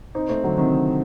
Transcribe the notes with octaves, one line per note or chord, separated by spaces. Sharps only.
C4 D#4
A3 C4
D3 F#3
C3 D#3